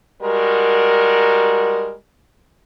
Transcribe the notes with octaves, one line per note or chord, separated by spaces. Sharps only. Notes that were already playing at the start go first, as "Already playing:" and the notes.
G3 G#3 F#4 A#4